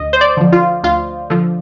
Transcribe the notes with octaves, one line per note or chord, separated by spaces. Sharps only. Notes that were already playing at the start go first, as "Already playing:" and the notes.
Already playing: D2 D#5
C5
D5
D3 F3
F4
D2 F4
D3 F3